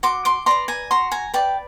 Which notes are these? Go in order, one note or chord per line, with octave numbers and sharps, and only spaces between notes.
F#4 C6 D6
C6 D6
B4 D5 A#5 C6
G#5 A#5
F#4 A#5 C6
G#5 A#5
B4 D5 G5 A5